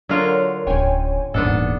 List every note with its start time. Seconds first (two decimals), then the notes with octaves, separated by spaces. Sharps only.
0.09 D3 F#3 F4 A#4 C#5
0.67 D1 C#4 C#5 G5 G#5
1.34 D#1 G#2 E3 B3 D4 A4